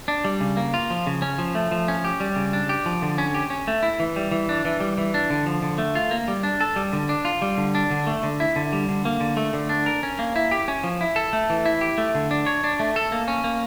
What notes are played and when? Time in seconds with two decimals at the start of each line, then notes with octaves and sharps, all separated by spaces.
0.08 D4
0.24 G3
0.40 C#3
0.57 A#3
0.74 F4
0.90 F3
1.07 C#3
1.22 C#4
1.38 F3
1.55 A3
1.71 F3
1.88 C#4
2.04 G4
2.20 G3
2.36 C#3
2.53 D4
2.69 G4
2.86 F3
3.02 D3
3.18 C#4
3.34 G4
3.50 C#4
3.68 A3
3.83 E4
4.00 E3
4.16 G3
4.32 E3
4.49 D4
4.65 E3
4.80 G3
4.98 E3
5.14 D4
5.30 D3
5.46 F3
5.62 D3
5.78 A3
5.95 F4
6.11 A#3
6.28 G3
6.43 D4
6.61 A4
6.76 G3
6.93 D3
7.09 D4
7.25 F4
7.42 G3
7.58 D3
7.75 D4
7.90 D3
8.07 A3
8.23 D3
8.40 E4
8.56 D3
8.73 G3
8.89 D3
9.05 A#3
9.20 D3
9.37 A3
9.53 D3
9.69 D4
9.86 A#4
10.03 C#4
10.19 A#3
10.36 E4
10.51 G4
10.68 C#4
10.84 F3
11.01 E4
11.16 A4
11.33 A3
11.50 E3
11.66 E4
11.81 G4
11.98 A3
12.15 D3
12.31 D4
12.46 C#5
12.64 D4
12.80 A3
12.96 A4
13.12 A#3
13.28 C#4
13.44 A#3